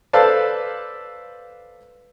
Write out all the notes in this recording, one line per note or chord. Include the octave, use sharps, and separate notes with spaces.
A4 B4 C5 D5 F5 A5